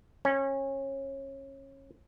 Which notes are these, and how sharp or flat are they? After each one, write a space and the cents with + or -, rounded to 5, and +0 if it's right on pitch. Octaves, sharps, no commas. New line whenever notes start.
C#4 -25